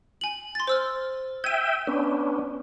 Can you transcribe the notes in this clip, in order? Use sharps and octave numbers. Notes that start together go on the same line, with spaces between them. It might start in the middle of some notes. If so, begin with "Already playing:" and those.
G#5 F#7
C6 A6
C5 E6 F6
E5 G5 G#6 D#7
B3 C#4 D4